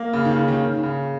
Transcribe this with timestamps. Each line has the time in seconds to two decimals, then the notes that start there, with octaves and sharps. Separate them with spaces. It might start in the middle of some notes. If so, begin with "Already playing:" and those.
Already playing: A#3
0.13 C#3
0.25 D#3
0.36 C#3
0.48 D#3
0.83 C#3